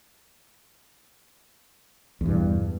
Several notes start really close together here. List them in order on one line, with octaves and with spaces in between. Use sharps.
E2 G2 B2